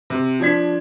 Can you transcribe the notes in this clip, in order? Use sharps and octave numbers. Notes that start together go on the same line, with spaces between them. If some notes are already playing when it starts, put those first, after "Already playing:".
C3
F3 D4 G#6 B6